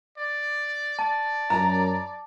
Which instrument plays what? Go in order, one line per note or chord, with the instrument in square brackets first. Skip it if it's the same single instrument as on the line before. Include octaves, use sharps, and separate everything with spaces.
[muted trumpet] D5
[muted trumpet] D5 [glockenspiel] A5
[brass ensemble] F#2 [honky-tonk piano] A#5